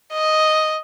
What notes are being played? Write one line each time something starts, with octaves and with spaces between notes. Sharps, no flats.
D#5